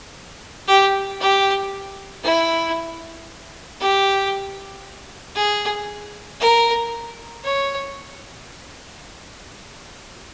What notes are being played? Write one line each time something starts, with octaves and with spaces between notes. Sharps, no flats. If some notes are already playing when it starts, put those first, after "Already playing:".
G4
G4
E4
G4
G#4
A#4
C#5